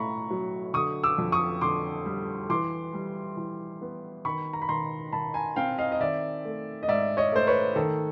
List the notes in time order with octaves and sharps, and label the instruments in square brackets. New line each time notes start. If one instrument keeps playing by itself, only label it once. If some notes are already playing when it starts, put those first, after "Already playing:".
Already playing: [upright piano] A2 A3 A#5 B5 C#6
F#3
D3 C#6 D#6
D6 E6
F2
C#6 D#6
D3 C6 D6
G3
E3 C6 D6
G3
E3
B3
D#3 B5 C#6
A#5
B5
D#3 A#5 C6
D#3 A5 B5
G#5 A#5
C4 F5 G5
D#5 F5
D#5
D#3 D5 E5
A3
D#5
G#2 D5 E5
C#5 D#5
A3 C5
B4 C#5
D#3 A4